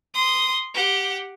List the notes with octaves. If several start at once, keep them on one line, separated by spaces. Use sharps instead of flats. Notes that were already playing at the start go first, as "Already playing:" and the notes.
C6 D#6
G4 F#5